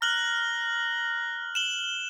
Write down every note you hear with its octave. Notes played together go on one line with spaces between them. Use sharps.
A#5 F6 F#6 F#7
E7 F#7 G7